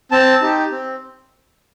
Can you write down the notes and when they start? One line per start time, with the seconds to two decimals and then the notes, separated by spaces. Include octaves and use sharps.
0.11 C4 A5
0.41 D#4 G4
0.71 C4